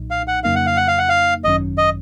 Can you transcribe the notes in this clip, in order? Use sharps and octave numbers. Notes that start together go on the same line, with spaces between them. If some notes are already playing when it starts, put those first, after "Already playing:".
Already playing: B1 A#2 F#3 D#4
F5
F#5
F2 C#3 F#3 A#3 D#4 F5
F#5
F5
F#5
F5
F#5
F5
G#1 F#2 D#3 F#3 C#4 D#5
D#5